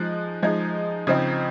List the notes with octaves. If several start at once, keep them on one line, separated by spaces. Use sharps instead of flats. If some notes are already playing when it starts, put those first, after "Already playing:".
Already playing: F3 G#3 D#4 F#6
F3 G#3 D#4 G#6
C#3 F3 C4 D#4 G#6